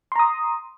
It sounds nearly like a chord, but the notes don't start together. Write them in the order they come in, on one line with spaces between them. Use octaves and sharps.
C6 A#5 D#6